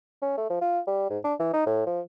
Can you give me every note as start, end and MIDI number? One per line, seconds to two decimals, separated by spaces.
0.22 0.36 61
0.38 0.45 57
0.50 0.58 53
0.61 0.80 65
0.87 1.09 55
1.10 1.18 44
1.24 1.34 62
1.39 1.53 52
1.53 1.66 63
1.66 1.86 45
1.86 2.00 53